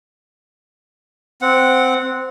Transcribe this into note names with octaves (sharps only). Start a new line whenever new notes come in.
C4 F#5